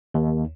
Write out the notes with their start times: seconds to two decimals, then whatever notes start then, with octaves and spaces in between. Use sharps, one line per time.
0.14 D#2